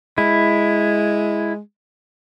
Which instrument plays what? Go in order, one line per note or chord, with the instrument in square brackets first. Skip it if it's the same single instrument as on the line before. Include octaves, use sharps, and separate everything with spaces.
[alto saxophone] G#3 [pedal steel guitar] E4